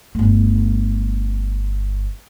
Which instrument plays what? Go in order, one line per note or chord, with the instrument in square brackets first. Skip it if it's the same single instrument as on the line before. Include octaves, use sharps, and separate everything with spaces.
[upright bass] G1 A3